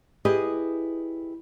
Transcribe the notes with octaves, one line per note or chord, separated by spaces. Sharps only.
E4 G4 G#4 B4 D#5